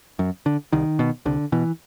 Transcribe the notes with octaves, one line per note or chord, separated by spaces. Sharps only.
F#2
D3
C2 D#3
B2
C2 D3
B2 E3